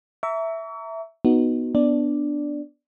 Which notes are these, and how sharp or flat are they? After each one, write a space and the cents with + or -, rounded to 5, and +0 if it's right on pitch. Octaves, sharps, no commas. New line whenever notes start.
E5 +0 A#5 -20 C#6 +40
B3 -5 D#4 +0 F#4 +0
B3 +0 D4 +0 D5 +0